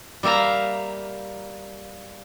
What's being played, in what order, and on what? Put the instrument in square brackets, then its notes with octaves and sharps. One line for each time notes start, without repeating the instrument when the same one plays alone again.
[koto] G3 A#3 E5 F5 A#5